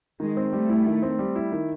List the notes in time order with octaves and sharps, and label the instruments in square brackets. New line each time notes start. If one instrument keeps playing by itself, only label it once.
[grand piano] D#3 [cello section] G#3
[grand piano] C4
[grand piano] G3 [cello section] A3
[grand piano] E4
D#3
C4
G3
E4
D#3